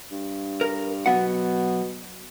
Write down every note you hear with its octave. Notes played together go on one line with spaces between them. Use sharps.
G2
A#4
B2 F#3 B3 F#5